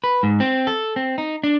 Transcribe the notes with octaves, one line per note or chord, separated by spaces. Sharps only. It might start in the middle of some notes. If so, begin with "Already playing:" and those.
B4
G#2
C4
A4
C4
D#4
D4